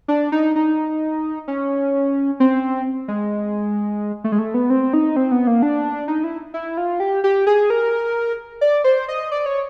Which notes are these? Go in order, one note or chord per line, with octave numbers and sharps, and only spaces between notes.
D4
D#4
D#4
C#4
C4
G#3
A3
G#3
A3
B3
C4
D#4
C4
B3
A#3
D4
D#4
E4
E4
F4
G4
G4
G#4
A#4
D5
C5
D#5
D5
C#5